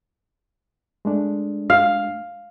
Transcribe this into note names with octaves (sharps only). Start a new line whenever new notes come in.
G#3 A3 D4
F5